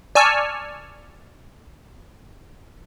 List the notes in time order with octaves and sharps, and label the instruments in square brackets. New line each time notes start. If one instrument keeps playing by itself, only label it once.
[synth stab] D5 G#5 A5 C#6 E6 F6